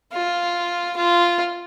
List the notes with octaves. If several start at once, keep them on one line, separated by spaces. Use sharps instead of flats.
F4
F4